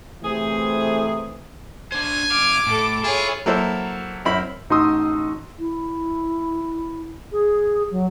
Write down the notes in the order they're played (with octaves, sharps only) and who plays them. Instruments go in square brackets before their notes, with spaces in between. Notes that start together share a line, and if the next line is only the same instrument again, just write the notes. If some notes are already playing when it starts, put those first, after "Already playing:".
[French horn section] C3 E3 A3 [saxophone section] G#4 C5
[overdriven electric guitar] D4 C5 [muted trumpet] G#5
[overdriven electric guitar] F#2 F5 [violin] D6
[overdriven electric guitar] A2 [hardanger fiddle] A4 A5
[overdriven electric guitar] E4 [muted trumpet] F4 [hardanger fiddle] G#4 C#5
[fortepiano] F#3 A#3 E4 A4 C5
F#2 C4 E4 B5
[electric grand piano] A1 D#4 F#4 C6 D#6 E6
[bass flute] E4
G#4
F#3